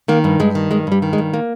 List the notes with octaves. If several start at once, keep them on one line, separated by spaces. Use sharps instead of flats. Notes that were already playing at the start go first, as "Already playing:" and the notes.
D#3 A#3
G2
G2 G#3
D#3
G2 G#3
G2 G3
D#3
G#3
G2
A#3